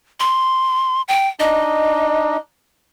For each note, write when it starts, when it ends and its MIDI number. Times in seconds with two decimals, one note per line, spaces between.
0.20 1.02 84
1.08 1.28 79
1.40 2.37 62
1.40 2.37 63
1.40 2.37 75